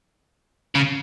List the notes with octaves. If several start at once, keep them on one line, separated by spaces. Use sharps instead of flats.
C#3